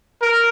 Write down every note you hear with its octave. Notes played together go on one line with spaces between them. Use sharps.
A#4